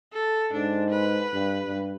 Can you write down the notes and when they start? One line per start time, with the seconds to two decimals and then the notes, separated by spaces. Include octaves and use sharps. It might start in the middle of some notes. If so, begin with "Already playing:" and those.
0.12 A4
0.53 G#2 D4
0.90 B4
1.33 G2
1.65 G2